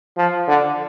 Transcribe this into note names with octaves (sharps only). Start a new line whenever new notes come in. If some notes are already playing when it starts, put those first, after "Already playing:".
F3
D3